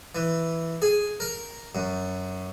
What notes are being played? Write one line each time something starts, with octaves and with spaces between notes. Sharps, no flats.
E3
G#4
A#4
F#2